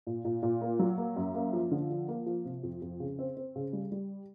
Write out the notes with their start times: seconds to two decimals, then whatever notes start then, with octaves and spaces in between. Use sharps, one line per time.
0.07 A#2
0.24 A#2
0.42 A#2
0.61 A#3
0.79 F#3
0.98 A#3
1.17 F#2
1.34 A#3
1.53 F3
1.71 D3
1.90 F3
2.08 A#3
2.26 F3
2.45 C3
2.63 F2
2.82 F2
3.00 C#3
3.19 C4
3.37 C4
3.56 C#3
3.73 G3
3.92 G3